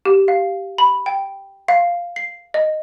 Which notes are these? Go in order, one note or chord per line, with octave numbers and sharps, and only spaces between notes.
G4
F5
B5
G5
F5
C7
D#5